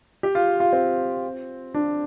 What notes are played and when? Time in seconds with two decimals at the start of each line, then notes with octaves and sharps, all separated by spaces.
0.23 G4
0.35 F4
0.60 F4
0.73 C4
1.74 D4